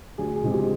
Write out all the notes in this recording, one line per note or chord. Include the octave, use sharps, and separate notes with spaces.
D2 G#4
G#4
C#3 F3 G#3 C4 G4
G#4